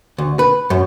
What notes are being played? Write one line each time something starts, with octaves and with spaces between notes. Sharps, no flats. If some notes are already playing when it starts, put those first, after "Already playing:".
D2
B4
F#2